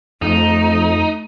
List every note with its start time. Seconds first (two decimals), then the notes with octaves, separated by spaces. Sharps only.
0.22 F2 A3 D#4